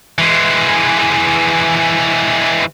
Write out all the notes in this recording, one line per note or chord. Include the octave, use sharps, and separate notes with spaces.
E3 G#3